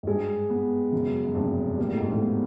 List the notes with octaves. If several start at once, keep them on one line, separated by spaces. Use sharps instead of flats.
G#2
G2 G#3
B3
F#2 C#3
F#2
F1 G2
A#2 G3
A2
G#2
A2
B3